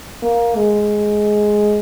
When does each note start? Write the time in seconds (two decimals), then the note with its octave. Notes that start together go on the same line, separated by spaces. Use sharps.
0.22 A#3
0.56 G#3